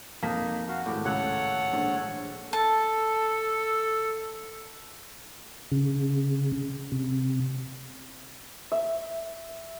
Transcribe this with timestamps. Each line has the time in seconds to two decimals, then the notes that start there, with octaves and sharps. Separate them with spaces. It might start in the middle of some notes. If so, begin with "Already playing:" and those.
0.23 F2 A#3 D#4 A5 B6
0.68 F#4 F5
0.86 G#1 A2 G4
1.05 C#2 A4 C#5 F#5 F#6
1.73 A#1
2.53 A4 A5
5.72 C#3
6.92 C3
8.72 E5